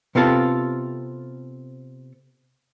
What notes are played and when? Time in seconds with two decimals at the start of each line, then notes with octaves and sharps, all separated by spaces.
0.15 C3 B3 C4 F4 A4